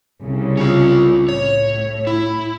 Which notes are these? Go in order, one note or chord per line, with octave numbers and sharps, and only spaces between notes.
C2 C#3
C#4 F4
A2 C#5
E4